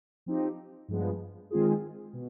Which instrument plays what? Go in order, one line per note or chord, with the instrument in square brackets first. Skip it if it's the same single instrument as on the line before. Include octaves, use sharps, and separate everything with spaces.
[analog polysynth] F3 C4 D#4 G4
G2 F3 G#3 B3
D#3 G#3 C4 F4 G#4
B2